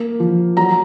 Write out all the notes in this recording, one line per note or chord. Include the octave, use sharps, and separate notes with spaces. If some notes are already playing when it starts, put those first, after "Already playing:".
Already playing: A#3
F3
F#3 A#5